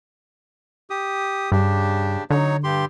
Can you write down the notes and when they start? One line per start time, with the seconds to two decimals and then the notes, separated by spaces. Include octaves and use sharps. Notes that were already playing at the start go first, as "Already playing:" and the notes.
0.90 G4 D#6
1.52 G2 C#3 D4 G4
2.30 D3 F#3 D#4 C#5
2.64 G2 G4 C6